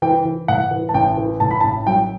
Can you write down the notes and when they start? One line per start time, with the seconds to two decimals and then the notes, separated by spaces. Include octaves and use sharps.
0.02 E3 G5
0.25 E3
0.48 A2 F#5
0.71 E3
0.89 A5
0.94 A1 G5
1.17 E3
1.40 A2 A5
1.51 B5
1.60 A5
1.64 A1
1.87 F#3 G5